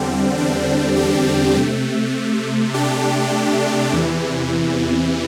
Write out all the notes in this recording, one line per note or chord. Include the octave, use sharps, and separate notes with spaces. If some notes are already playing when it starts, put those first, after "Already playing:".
Already playing: E2 D3 G3 C4
D4
D4 G4
C3 A3
D4 G4
E2 C3 E3